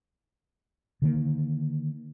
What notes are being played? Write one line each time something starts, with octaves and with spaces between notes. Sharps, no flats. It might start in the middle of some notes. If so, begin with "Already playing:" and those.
D3 D#3 A#3